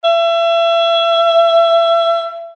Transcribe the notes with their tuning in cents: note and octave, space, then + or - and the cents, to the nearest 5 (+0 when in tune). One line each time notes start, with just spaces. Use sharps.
E5 +30